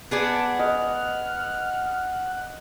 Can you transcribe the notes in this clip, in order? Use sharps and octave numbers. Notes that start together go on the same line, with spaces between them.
B3 G#4 D5 F#5 A5
D#5 F6